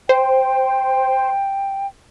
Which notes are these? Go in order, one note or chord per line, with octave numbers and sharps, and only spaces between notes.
C5 G5